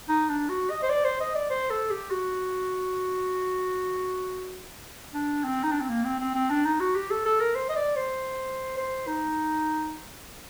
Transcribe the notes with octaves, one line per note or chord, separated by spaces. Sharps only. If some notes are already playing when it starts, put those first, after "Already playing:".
D#4
D4
F#4
D#5
C5
D5
C5
D#5
D5
C5
A4
G4
F#4
D4
C4
D#4
D4
C4
A#3
C4
C4
C4
D4
D#4
F#4
G4
A4
A4
A#4
C5
D#5
D5
C5
C5
D#4